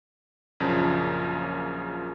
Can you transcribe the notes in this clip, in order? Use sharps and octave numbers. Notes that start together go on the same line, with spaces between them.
A#1 F#2 C#3 F3 A5